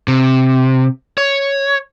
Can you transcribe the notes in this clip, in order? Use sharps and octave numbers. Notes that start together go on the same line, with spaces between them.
C3
C#5